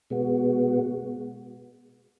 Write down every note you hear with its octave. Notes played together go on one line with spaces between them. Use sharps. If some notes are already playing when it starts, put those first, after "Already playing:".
B2 G#3 B3 F#4